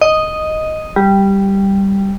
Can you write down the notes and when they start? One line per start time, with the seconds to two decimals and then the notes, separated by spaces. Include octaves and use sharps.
0.01 D#5
0.96 G3